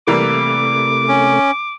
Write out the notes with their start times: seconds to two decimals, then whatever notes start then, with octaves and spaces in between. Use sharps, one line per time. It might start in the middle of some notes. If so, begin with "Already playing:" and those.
0.07 C3 E3 G3 A3 A#3 D6
1.08 C#4